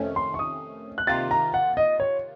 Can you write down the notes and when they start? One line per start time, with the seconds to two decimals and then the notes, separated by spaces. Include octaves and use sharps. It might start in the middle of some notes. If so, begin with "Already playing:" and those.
Already playing: F2 C3 D#3 A3 C#4
0.16 C6
0.34 C#6
0.39 D#6
0.98 F#6
1.07 C3 D#3 A#3 F4 A6
1.31 A#5
1.54 F#5
1.77 D#5
2.00 C#5